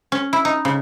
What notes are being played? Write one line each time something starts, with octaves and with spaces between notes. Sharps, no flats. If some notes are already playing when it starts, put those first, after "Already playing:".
C#4
E4
D#4
C#3